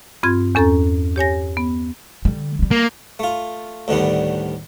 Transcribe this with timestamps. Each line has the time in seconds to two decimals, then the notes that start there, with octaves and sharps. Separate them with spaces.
0.23 G2 C4 F4 G#6
0.55 E2 C#4 A4 A#5 A6
1.16 G4 C#5 G#5 A#6
1.57 B3
2.25 D3 G3
2.59 G3 G#3
2.71 A#3
3.19 A3 F4
3.88 D2 A2 D3 D#3 G3 B3